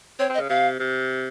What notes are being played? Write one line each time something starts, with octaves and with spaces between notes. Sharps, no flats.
C4 C#5
C4
D#5
C#3
C3 F5
C3